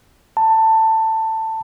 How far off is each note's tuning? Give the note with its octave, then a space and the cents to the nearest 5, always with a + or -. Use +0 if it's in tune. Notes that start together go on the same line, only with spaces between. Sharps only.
A5 +15